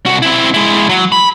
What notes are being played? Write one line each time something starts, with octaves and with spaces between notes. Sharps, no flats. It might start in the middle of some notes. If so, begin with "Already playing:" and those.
C2 F#4
C4 E4
G#3 E4
F#3
B5